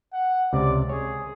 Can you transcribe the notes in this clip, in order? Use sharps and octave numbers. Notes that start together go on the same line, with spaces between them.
F#5
C#2 C3 D5
G#4 C#5